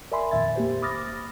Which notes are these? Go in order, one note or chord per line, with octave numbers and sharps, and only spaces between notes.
A#4 D5 E5 G#5 B5 C6
F2 A#2 D#3 E5 G#6 A6
A#3 G4 C5
B5 D6 D#6 F6 A6 A#6